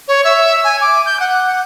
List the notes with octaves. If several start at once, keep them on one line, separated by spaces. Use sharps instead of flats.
C#5
E5
G#5
D6
G6
F#5